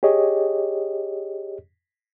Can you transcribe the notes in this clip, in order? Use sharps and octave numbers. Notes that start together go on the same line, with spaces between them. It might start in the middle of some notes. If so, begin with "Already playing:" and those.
G4 G#4 C#5 D#5